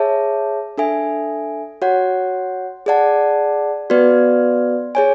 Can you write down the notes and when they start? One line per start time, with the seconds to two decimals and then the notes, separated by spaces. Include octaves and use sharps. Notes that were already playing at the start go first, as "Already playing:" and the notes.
Already playing: G#4 C#5 E5 A5
0.78 D4 A4 E5 G#5
1.82 F#4 C#5 F#5
2.86 G#4 D5 F#5 A5
3.90 B3 F#4 B4 D5
4.95 G#4 C#5 G#5